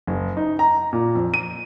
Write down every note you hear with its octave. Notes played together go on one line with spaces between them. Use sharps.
F#1
D#4
A#5
A#2
F2
D#7